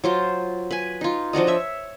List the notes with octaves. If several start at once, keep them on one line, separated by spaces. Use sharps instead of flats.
F#3 F4 C5
B4 G#5
D#4 F4
F3 D4 F#4 D#5
C#5 E5